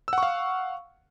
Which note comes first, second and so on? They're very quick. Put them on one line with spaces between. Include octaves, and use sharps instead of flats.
E6 F#5 C#6 F5